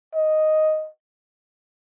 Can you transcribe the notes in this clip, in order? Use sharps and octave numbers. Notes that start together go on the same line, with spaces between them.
D#5